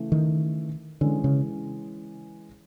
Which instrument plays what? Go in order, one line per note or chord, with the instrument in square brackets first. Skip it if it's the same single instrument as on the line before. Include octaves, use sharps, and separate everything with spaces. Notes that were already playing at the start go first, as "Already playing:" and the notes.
Already playing: [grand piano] C#3 E3 A3
[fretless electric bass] D#3
[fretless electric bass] D3 [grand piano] E3 G#3 C#4
[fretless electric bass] C#3